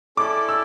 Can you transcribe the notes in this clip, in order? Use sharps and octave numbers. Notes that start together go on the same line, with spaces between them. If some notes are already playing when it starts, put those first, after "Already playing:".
C#4 E4 A4 D5 D6
E6